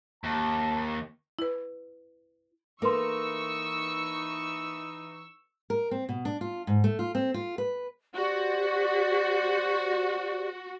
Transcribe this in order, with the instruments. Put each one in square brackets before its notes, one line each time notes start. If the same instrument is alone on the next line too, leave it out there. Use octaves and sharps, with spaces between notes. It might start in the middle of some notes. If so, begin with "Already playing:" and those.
[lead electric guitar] D#2 [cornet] A5
[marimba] E4 B4
[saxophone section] E3 D#4 [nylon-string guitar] A#3 [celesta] A4 B4 C6 [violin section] C#6 E6
[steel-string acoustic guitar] A#4
C4
B2
D4
F4
G#2
A3
F4
C4
F4
B4
[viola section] F#4 [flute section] G4 C5 D5